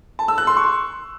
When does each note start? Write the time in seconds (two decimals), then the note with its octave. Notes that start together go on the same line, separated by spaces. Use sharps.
0.19 A5
0.28 E6
0.38 F#6
0.47 C6
0.57 C#6